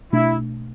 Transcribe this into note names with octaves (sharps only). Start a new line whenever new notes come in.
B2 A3 D4 E4